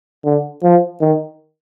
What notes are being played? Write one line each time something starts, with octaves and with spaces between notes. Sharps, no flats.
D3
F3
D#3